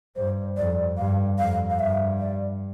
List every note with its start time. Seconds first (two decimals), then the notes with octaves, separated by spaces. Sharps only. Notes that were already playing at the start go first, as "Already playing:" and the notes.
0.16 G2 C5
0.57 F2 D5
0.98 G2 F5
1.38 F2 F5
1.70 F5
1.79 G2 E5
2.20 D5